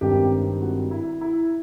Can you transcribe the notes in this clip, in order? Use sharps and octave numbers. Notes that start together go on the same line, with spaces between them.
G#1 G2 D#3 G3 C4 G4
F#4
E4
E4